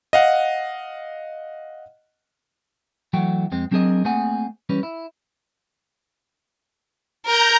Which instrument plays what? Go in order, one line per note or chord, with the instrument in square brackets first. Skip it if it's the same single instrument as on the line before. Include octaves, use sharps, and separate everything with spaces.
[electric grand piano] D#5 F5 F#5
[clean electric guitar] E3 F#3 A3 F#4 G5
F2 G#3 C4
F#3 C4 D4 G#4 A#4 D#5
A3 A#3 C4 G#4 F#5 G#5
E3 G3 C#4 B4
E4
[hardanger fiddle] A#4 [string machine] A#5 G6